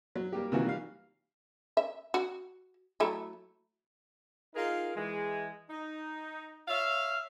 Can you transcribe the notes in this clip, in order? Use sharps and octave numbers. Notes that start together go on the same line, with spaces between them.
F#3
G3 A#3 G4
C3 D#3 E3 A#3 F4 F#4
G3 F5
E5
F#4
F#3 A3 E4
D#4 F4 G#4 A#4
E3 G#3
D#4
C#5 E5 F5